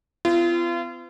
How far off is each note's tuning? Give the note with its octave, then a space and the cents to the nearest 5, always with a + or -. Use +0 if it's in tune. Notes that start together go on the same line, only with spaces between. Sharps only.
C4 -45 F4 -35